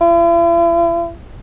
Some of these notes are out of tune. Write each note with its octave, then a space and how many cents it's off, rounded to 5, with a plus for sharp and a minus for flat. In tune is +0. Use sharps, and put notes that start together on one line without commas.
E4 +45